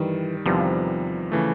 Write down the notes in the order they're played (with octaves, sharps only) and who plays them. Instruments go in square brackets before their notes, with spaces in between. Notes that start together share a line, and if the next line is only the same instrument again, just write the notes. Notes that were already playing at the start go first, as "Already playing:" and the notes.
Already playing: [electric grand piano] G2 D#3 G3 [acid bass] E3
[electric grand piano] E2 C3 D#3 G3 B3 [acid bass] F3
[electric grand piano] C#3 E3 A3